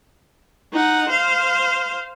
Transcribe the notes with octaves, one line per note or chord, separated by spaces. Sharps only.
D#4 F#5
C5 F5